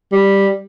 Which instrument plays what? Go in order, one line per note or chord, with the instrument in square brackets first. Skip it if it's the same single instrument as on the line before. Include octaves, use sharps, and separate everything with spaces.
[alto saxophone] G3